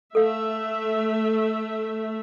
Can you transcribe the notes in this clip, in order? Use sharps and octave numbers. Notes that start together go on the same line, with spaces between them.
A3 A4 E5 F5